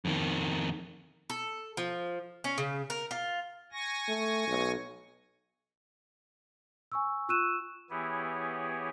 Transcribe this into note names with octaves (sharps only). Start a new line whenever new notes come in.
F2 D#3
A4
F3
C#4
C#3
A#4
F4
G#5 C#6 A#6
A3
B1
G#5 C#6 E6
F4 C#6 E6 F#6 D#7 E7
E3 B3 E4 G4 G#4 C#5